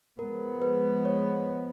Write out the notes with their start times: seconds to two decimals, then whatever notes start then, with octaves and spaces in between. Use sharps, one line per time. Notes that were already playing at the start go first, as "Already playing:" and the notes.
0.19 F3 G#3 B3 A#4
0.62 B4
1.05 C#5